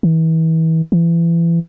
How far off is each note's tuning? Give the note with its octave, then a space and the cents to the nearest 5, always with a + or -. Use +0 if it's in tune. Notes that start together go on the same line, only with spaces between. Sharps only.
E3 -35
E3 +30